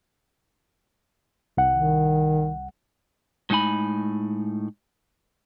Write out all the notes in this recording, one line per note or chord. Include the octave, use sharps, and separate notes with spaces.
C2 F#5
D#3
A2 G#3 D#4 G#5 B5